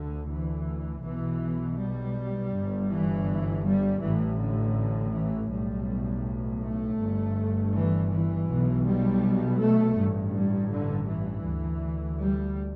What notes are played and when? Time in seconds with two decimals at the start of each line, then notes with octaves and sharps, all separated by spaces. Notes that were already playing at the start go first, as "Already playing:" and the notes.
Already playing: D2 D3
0.30 E3
1.04 B1 B2 E3
1.79 G3
2.53 G1 G2
2.90 E3
3.65 G3
4.02 A1 A2 E3
4.39 D3
5.13 E3
5.50 B1 A2 G3
6.62 A3
7.00 G1 G2
7.74 E3
8.11 E3
8.48 B1 B2
8.86 G3
9.59 A3
9.97 A1 G2
10.34 G3
10.71 D3
11.09 E3
11.46 D2
12.20 G3